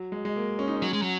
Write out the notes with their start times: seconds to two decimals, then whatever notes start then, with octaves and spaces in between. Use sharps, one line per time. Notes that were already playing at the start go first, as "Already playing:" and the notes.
Already playing: F#3
0.12 G#3
0.25 G#3
0.36 A#3
0.59 C#4
0.68 D#4
0.77 C#4
0.82 F#3
0.93 G#3
1.02 F#3